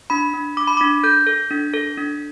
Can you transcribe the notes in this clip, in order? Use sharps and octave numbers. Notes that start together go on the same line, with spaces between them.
D4 B5
D4
D4 D6
B5
D4 D6
A4 G6
A4
D4
A4
D4